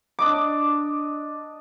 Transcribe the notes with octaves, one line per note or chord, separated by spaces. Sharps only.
D4 D#5 D6